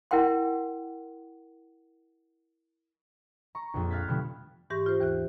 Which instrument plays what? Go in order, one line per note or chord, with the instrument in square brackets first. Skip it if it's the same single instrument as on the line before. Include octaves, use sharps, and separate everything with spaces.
[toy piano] E4 A#4 F#5 G5 C6
[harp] A#5 C#6
A#1 F2
F5 F6 F#6 G#6 A6 B6
B2 D3 F3 G3 A3
[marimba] G#2 E3 G4 C#6 A#6
F4 G4 C5
D#2 E3 F#6